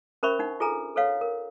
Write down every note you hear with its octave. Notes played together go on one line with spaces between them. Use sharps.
C#4 A#4 C5 E5 B5 C#6
D4 D#4 F#5
F4 G#4 A4 B4 G#5 A#5
A4 B4 C#5 F5 F#5
A#4